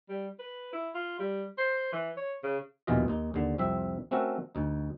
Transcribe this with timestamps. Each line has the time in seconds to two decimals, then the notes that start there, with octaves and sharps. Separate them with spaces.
0.09 G3
0.39 B4
0.73 E4
0.94 F4
1.19 G3
1.58 C5
1.92 E3
2.17 C#5
2.43 C#3
2.87 A#1 D#2 B2 E3 F4 D#5
3.08 D#2 D#4
3.34 D#2 D3
3.58 C2 F2 C4 E5
4.11 A3 C4 C#4 F#4 A4 A#4
4.55 D2 D#4